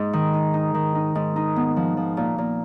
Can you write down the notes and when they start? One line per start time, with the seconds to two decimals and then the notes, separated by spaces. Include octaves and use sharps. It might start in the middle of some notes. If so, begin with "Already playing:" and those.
Already playing: G#2
0.13 D#3
0.34 D#4
0.54 D#4
0.74 D#3
0.95 D#4
1.15 G#2
1.36 D#4
1.56 B3
1.76 F3
1.97 F3
2.17 A#2
2.38 A#2